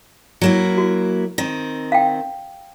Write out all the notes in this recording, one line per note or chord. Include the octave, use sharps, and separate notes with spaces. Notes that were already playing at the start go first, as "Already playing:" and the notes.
F#3 A#3 E4
F#4
D#3 C4
F5 G5